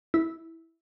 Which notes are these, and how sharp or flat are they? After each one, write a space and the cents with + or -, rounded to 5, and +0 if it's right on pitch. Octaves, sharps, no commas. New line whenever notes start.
E4 -10